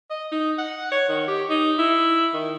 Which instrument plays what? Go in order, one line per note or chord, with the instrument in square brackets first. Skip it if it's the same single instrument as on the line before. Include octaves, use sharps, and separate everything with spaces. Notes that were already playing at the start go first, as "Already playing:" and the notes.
[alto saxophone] D#5
D#4
F#5
C#5
D#3
G4
D#4
E4
D#3